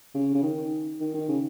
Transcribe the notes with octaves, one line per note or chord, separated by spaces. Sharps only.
C#3
C#3
D#3
D#3
D#3
C#3